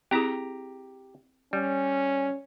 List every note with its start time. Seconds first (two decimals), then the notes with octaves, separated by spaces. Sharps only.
0.11 C4 E4 G4 G#4 A#5
1.53 G3 C#4